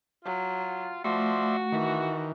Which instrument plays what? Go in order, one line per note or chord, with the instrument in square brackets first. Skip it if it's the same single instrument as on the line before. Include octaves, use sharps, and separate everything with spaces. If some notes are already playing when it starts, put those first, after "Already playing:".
[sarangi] F#3 [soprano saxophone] F4
[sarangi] F3 [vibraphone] A3 [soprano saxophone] F#4 [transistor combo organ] D5 E5 C6
[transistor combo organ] D#3 [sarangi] E3